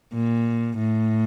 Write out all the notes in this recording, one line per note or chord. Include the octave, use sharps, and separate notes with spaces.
A#2
A2